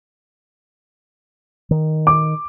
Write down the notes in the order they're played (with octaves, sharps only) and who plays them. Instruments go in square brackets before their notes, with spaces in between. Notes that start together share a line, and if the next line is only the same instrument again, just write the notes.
[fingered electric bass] D#3
[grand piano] D6